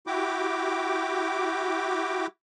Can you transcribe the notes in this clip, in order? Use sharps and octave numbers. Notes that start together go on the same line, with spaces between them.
E4 F#4 G4 G5 D6